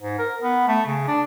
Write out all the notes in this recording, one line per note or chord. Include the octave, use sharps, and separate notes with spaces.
G#2
A#4
B3
A3
C#3
D4